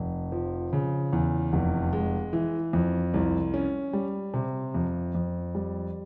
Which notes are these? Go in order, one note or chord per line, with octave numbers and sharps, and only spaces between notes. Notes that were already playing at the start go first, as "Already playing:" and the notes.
Already playing: F1
F3
C#3
E2
F1
G#3
E3
F2
C2
C#4
G3
C3
F2
F2
G3